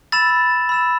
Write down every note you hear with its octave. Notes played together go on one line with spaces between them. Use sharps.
B5 E6 A6 E7
B5 E6 A6 E7